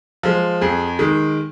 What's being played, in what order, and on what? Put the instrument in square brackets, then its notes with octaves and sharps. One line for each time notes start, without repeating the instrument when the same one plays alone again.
[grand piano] F3 G#3
F2 G#4
D#3 G#3